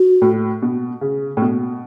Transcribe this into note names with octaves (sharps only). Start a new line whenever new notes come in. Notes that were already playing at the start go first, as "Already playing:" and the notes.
Already playing: F#4
A2
B2
C#3
A2
B2